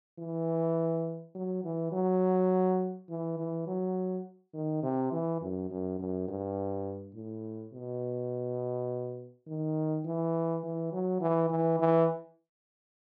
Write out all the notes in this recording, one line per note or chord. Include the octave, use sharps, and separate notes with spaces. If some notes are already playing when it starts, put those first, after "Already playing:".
E3
F#3
E3
F#3
E3
E3
F#3
D#3
C3
E3
F#2
F#2
F#2
G2
A2
B2
D#3
E3
E3
F#3
E3
E3
E3